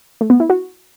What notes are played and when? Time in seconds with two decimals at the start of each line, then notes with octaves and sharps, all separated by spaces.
0.21 A3
0.30 B3
0.40 E4
0.50 F#4